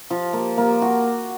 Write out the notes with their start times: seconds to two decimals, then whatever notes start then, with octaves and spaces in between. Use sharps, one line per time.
0.10 F3
0.33 A#3
0.58 A#3
0.82 F#4